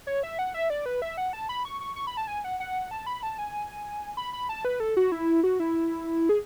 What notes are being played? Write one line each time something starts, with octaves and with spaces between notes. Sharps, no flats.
C#5
E5
F#5
E5
D5
B4
E5
F#5
A5
B5
C#6
C#6
C#6
B5
A5
G#5
F#5
F#5
A5
B5
A5
G#5
B5
B5
A5
B4
A4
F#4
E4
F#4
E4
G#4